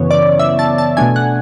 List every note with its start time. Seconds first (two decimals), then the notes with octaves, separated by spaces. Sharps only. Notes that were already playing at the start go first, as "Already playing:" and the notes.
Already playing: F#2 C#3 E3 B3 C#5
0.11 D5
0.39 E5
0.59 A5
0.78 A5
0.97 B2 A3 D4 G#5
1.16 F#5